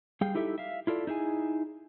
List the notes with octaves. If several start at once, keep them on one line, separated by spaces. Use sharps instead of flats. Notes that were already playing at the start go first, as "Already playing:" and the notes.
G3 G#4 F5 G5
D#4 E4 G4 A4 E5
E5 F5
E4 F4 A4 D5
D#4 E4 G#4 G#5